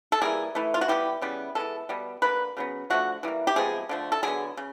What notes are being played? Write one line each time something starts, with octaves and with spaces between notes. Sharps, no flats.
A4
E3 G3 A#3 G#4
E3 A3
F4
F#4
E3 G3 B3 G4
C#3 E3 G3 B3
E3 G#3 B3 A4
B2 G3 B3
D3 G3 A#3 B4
C#3 F#3 B3
D3 F3 A3 F#4
E3 G3 A#3
G4
C3 F3 G#3 B3 G#4
D3 F3 A3
A4
D3 F#3 B3 G#4
C#3